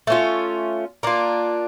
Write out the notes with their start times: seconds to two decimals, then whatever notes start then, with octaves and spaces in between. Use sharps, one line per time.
0.07 A3 C#4 F4
1.03 A#3 D4 F4